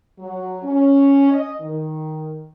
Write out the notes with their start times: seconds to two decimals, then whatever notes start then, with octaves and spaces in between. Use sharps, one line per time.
0.19 F#3
0.63 C#4
1.31 D#5
1.60 D#3